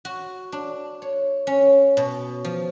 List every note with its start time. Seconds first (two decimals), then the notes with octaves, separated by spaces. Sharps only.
0.05 F#4
0.52 D4
1.02 C#5
1.47 C#4
1.97 B2
2.45 F3